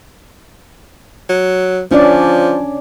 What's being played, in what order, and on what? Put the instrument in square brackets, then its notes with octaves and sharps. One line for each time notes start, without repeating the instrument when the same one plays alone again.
[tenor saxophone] F#3
[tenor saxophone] F3 [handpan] C#4 D4 D5